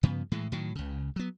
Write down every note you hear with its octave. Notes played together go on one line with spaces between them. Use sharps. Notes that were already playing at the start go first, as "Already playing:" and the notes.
G2 C#3 F3 B3
A2 E3 G#3
A2 D#3 F#3
C#2 C#3
F#3 B3